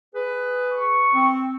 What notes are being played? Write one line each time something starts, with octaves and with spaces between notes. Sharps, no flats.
G#4 B4
C#6
C4